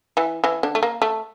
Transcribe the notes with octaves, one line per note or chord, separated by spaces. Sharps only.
E3 E4
E3 E4
D3 D4
A3
A#3
A3